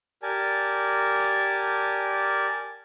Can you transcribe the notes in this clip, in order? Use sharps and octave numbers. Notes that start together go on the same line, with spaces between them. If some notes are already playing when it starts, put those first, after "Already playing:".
G4 A#4 D5 G#5 A5